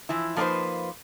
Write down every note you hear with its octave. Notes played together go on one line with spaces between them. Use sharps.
E3 F3 E4
F3 A#3 D4 D#4 B4 C5